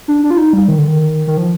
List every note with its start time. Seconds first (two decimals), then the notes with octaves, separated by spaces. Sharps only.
0.08 D4
0.24 D4
0.31 F4
0.38 D#4
0.53 G3
0.68 D#3
0.78 D3
0.87 D#3
1.27 D#3
1.37 F3